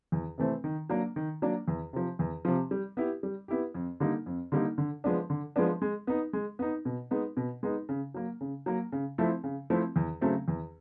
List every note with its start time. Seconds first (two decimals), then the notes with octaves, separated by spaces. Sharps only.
0.12 E2
0.38 C3 E3 A3 C4
0.64 D#3
0.90 F#3 A#3 D4
1.16 D#3
1.42 F#3 A#3 D4
1.68 E2
1.93 C3 F3
2.19 E2
2.45 C3 F3
2.71 G3
2.97 B3 E4 G4
3.23 G3
3.48 B3 E4 G4
3.74 F2
4.00 D3 G3 A#3 D#4
4.26 F2
4.52 D3 G3 A#3 D#4
4.78 D3
5.04 F3 G#3 B3 D4
5.30 D3
5.56 F3 G#3 B3 D4
5.82 G#3
6.07 B3 D#4
6.33 G#3
6.59 B3 D#4
6.85 B2
7.11 G#3 B3 D#4
7.37 B2
7.63 G#3 B3 D#4
7.89 C#3
8.14 F#3 A#3
8.41 C#3
8.66 F#3 A#3
8.92 C#3
9.18 F3 A3 C4 E4
9.44 C#3
9.70 F3 A3 C4 E4
9.96 E2
10.21 C#3 F#3 A3 C4
10.48 E2